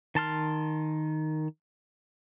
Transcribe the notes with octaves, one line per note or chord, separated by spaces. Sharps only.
D#3 A5 C6 F6